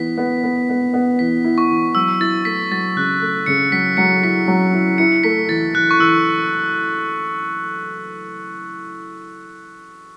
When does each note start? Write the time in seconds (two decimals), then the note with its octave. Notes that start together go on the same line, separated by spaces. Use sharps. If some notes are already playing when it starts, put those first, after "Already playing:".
Already playing: E3 B3 B6
0.18 B3
0.44 B3
0.69 B3
0.94 B3
1.19 E3 B6
1.44 E4
1.58 C#6
1.70 E3
1.95 F#3 E6
2.20 E4 A6
2.45 A3 B6
2.71 F#3 A6
2.96 C#3 F#6
3.22 A3
3.46 C#3 C#7
3.72 F#3 B6
3.97 F#3 C#7
4.23 E4 B6
4.48 F#3
4.73 E4
4.98 E4 C#7
5.24 A3 B6
5.49 E3 A6
5.75 E3 F#6
5.91 C#6
5.99 E3 E6